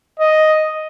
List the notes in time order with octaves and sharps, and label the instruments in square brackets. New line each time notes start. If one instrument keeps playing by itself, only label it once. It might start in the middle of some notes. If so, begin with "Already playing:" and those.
[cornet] D#5